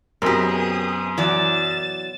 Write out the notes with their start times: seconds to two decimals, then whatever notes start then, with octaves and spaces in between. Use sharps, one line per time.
0.22 F#2 B2 C4 G4 G#4 A#4 D#6
1.18 E3 F#3 D5 A6 E7